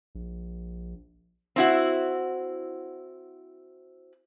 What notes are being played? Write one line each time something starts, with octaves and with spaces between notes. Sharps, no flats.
A#1
C4 E4 F#4